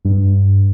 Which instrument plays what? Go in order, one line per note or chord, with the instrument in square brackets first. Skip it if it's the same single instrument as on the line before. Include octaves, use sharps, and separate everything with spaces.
[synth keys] G2